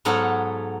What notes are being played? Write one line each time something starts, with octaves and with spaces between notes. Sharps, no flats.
G#2 F#3 B3 A4 C#5 F5